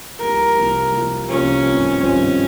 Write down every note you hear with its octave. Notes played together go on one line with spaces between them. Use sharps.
C2 C3 F3 A#3 A#4
C2 C3 F3 A#3
C2 C3 F3 A#3
C2 C3 F3 A#3 C#4
G#1 G2 F3 C4
G#1 G2 F3 C4 C#4